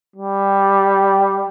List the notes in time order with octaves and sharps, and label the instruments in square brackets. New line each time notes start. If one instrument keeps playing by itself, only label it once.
[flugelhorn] G3